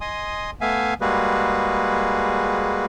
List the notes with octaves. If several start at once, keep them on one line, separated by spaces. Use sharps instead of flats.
D#5 G#5 C6 D#6
A3 B3 E5 F5 G#5
G3 G#3 A#3 F#4 G#4 B4